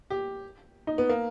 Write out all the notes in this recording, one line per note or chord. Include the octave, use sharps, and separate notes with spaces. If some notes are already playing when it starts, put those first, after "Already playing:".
G4
D#4
B3
A#3